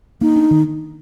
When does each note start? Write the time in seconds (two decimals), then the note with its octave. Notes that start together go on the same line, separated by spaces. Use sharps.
0.21 A#3 D#4
0.36 D4
0.51 D#3